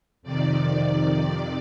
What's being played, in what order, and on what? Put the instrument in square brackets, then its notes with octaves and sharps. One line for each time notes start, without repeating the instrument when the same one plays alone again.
[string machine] F2 C3 D#3 D5